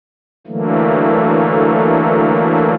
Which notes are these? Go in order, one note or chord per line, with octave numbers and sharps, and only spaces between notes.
D3 E3 F#3 A3 A#3